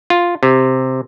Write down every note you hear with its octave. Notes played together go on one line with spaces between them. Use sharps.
F4
C3